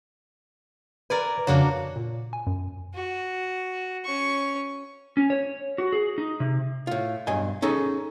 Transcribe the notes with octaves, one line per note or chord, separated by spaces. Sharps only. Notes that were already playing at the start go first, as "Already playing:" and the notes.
A#4 B4 D5 G#5
F2 C#3 A#3 D4 F#4 C#5
A#2
G#5
F#2
F#4
C#4 C#6
C#4
C#5
F#4
G#4
D#4
C3
A2 F4
B1 G2 D#5 G#5
C#4 D#4 G#4 A4